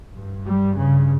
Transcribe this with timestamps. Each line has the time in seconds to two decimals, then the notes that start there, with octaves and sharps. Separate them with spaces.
0.11 G2
0.43 G3
0.74 C#3